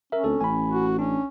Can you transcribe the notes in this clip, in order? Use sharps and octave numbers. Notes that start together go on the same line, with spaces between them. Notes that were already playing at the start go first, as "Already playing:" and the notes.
C#4 A#4 E5
D2 C4 A4
A1 G#5 B5
F#4
C#4 D4